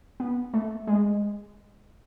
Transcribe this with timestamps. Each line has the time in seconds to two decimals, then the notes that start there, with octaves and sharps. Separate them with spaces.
0.20 B3
0.54 A3
0.87 G#3